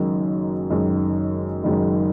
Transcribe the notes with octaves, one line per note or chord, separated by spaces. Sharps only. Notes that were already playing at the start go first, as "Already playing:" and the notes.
Already playing: F#1 F#2 D#3 G#3
F#1 F#2 D#3 G#3
F#1 F#2 D#3 G#3